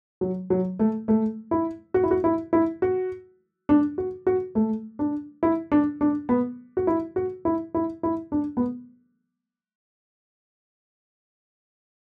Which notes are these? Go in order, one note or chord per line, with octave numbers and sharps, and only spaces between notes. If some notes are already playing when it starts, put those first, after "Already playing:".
F#3
F#3
A3
A3
E4
F#4
E4
F#4
E4
E4
F#4
D4
F#4
F#4
A3
D4
E4
D4
D4
B3
F#4
E4
F#4
E4
E4
E4
D4
B3